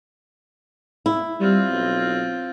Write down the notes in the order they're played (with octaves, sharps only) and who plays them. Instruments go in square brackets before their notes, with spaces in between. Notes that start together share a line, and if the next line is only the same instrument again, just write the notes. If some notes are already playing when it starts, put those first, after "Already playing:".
[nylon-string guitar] E4
[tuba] G3 [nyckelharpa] C4 F4
[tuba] B1